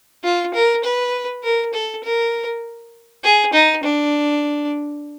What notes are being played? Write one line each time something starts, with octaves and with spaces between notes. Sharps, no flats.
F4
A#4
B4
A#4
A4
A#4
G#4
D#4
D4